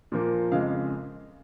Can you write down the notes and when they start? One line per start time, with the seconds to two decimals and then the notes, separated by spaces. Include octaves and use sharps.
0.12 A#2 F3 A#3
0.52 F2 C#3 G#3 F5